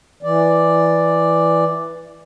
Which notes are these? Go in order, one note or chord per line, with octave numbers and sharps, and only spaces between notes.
E3 D5